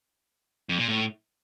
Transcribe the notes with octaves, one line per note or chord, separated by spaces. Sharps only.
F2
A#2
A2